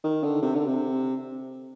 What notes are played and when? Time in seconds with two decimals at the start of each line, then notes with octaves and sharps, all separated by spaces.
0.04 D#3
0.23 D3
0.42 C3
0.55 D3
0.67 C3